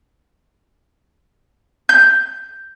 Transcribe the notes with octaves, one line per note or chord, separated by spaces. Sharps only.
G6